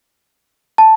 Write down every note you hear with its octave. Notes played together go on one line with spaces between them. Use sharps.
A5